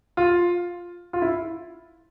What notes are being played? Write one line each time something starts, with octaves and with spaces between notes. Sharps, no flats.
F4
F4
E4